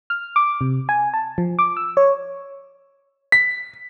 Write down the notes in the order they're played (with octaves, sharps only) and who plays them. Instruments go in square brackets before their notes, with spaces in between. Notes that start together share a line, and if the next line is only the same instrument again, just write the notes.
[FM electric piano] F6
D6
C3
G#5
A5
F3
D6
E6
C#5
[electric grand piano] B6